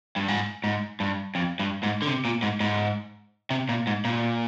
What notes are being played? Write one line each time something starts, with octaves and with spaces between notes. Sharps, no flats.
G2
G#2
G#2
G2
F2
G2
G#2
D3
C3
A#2
G#2
G#2
C3
A#2
G#2
A#2